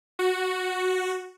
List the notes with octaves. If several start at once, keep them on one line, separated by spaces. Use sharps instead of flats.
F#4